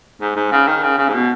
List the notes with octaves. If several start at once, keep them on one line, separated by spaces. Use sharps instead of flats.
G#2
G#2
C#3
D#3
C#3
C#3
G#2
B2